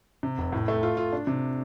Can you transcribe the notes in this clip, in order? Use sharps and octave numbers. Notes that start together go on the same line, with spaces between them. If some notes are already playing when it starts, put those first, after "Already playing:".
C3
F1
A2
A3
F4
F4
D4
C3